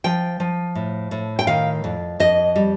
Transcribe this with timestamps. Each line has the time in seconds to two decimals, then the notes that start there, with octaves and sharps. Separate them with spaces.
0.04 F3 G5
0.40 F3
0.75 A2
1.11 A2
1.39 G5
1.47 D#3 F5
1.84 F2
2.20 F2 D#5
2.56 G3